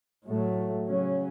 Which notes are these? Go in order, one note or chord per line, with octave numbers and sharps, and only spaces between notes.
A2 F#3 A3
C#3 F#3 C#4